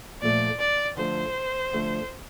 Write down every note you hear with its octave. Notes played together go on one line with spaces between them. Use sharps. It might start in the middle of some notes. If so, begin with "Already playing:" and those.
A#2 F3 A3 D5
D5
D3 F3 A3 C5
D3 F3 A3